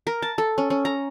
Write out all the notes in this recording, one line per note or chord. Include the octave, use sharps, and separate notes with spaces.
A#4
A5
A4
C#4
C#4
A#5